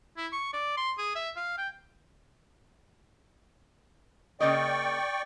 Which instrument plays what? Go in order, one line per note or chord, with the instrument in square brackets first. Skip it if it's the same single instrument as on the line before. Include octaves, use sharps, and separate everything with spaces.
[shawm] E4
C#6
D5
C6
G#4
E5
F5
G5
[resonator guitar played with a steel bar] C#3 A#3 D#5 [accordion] D5 G5 C#6